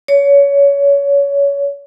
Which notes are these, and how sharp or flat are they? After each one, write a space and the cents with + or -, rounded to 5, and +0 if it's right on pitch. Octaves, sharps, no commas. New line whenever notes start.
C#5 +25